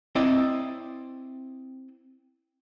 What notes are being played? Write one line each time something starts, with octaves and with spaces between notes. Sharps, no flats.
C4 E4 D5 D#5